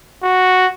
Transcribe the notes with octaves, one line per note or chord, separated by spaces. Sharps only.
F#4